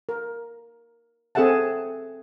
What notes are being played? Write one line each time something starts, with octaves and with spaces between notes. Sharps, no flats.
A#4
C4 G#4 A4 E5 F#5 A5